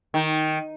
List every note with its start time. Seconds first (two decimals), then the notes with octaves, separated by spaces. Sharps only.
0.14 D#3